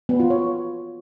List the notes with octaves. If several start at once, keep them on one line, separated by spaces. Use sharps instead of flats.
B3
F4
C#5